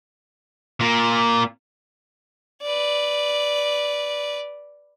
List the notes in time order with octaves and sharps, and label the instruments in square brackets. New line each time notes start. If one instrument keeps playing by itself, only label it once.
[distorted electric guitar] A#2 A#3
[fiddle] B4 D5